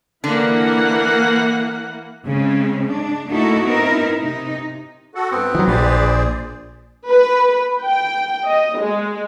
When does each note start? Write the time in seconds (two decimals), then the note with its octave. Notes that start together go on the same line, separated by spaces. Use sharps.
0.24 D3 E3 A#3 D4 F#5
2.27 C#3 G#3 C4
2.87 G#3 D4
3.30 A3 A#3 D#4 E4 F#4 A4
3.65 B3 C4 D#4 E4 A#4
4.20 C3 D#4
5.15 F#4 A4 F#5
5.31 G2 B3 C4
5.55 G#2 E3 F#3
5.68 A#1 G4 G#4 B4 C5 D5
7.09 B4
7.81 G5
8.46 D#5
8.80 G#3